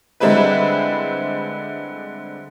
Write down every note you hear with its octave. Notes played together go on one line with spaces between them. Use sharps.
D3 G3 G#3 C4 E4 B4